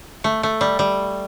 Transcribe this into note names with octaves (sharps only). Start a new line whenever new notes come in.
A3
A3
G3
G3